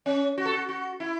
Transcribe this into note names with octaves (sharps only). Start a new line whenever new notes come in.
C#4
F#4
A4
F#4
F#4
E4